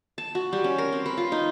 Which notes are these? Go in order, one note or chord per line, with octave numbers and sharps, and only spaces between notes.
A5
F#4
G3
C#4
A#4
C4
B4
F4
D#4